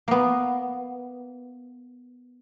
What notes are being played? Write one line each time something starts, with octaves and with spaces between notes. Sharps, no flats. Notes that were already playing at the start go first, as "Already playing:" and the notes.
A#3 B3